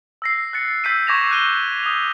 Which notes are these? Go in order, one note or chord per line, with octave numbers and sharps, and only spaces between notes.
E6 A#6 C7
F#6 A6 C#7
E6 G6 B6 C7 D7 D#7
C#6 D6 G#6 A#6 E7 F7
F#6 D#7 G7
D#6 F7